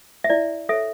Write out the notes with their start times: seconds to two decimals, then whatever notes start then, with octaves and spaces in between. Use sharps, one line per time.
0.24 E5
0.30 E4 D5
0.69 A4 C#5 E5